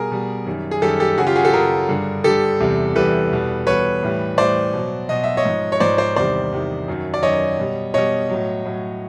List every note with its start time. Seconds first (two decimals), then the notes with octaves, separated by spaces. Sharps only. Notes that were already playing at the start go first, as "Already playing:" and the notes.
Already playing: B2 G3 G#4 A#4
0.11 B2 G3
0.46 F#2 D#3 G3
0.71 G#4
0.82 F#2 D#3 G3 G4 A4
1.00 G4 A4
1.18 F#2 C#3 F#3 F#4 G#4
1.27 F4 G4
1.36 F#4 G#4
1.45 G4 A4
1.53 F#2 C#3 F#3 G#4 A#4
1.89 G2 D3 G3
2.24 G2 D3 G3 G4 A4
2.60 E2 C3 E3 G3
2.95 E2 C3 E3 G3 A4 B4
3.32 E2 B2 G3
3.67 E2 B2 G3 B4 C#5
4.03 A2 E3 G3
4.38 A2 E3 G3 C5 D5
4.73 B2 F#3
5.09 B2 F#3 D#5
5.24 E5
5.37 C#5 D#5
5.45 G#2 F3
5.72 C#5
5.80 G#2 F3 C5 D5
5.98 C5 D5
6.16 E2 C3 D#3 G3 C5 D5
6.52 E2 C3 D#3 G3
6.88 F#2 D#3 F#3
7.14 D5
7.23 F#2 D#3 F#3 C#5 D#5
7.58 B2 G3
7.94 B2 G3 C#5 D#5
8.30 A2 F#3
8.65 A2 F#3